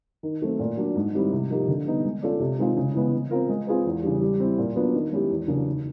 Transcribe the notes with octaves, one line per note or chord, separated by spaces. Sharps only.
D#3
F#3 A3 C4
A#2
F#3 A#3 D4 F#4
G#2
D#3 G3 C4 E4
C3
F3 A#3 D#4 G4
D3
G3 B3 D#4
G#3
C#4 F4 A4 D5
C3
D#3 G#3 C4 F4
C#3
E3 G#3 B3
G#3
C4 F4 A#4
G#3
C4 F4 G#4 B4
E2
C#3 E3 G3
G3
C4 E4
A#2
F#3 B3 D4 F4
D#3
G#3 C#4 E4 G4
E2
C#3 F#3 A#3 D4
D#3